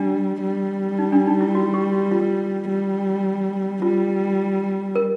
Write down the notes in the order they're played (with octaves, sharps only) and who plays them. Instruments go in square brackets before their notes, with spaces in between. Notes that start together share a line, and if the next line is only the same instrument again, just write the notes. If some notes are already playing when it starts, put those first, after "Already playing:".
Already playing: [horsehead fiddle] G3 [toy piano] D4
[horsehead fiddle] G3
[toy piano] D#4
D4
D#4
E4
F#4
G4
F#4
F4
[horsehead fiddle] G3
[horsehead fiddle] G3 [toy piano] F4
[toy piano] A#4